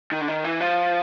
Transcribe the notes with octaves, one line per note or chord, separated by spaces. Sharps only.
D#3
D3
D#3
E3
F3